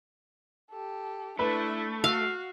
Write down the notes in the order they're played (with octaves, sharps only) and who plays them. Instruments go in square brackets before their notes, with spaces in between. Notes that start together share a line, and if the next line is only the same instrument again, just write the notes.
[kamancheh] G4 A4
[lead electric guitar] A3 [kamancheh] D4 E4 [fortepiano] B4
[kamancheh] F#4 [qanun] F5 [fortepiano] E6